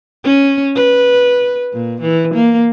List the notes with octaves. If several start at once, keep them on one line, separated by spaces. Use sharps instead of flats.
C#4
B4
A#2
E3
A#3